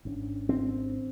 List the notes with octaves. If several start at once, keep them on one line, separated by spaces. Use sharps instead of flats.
G#1 C#4 D4
C4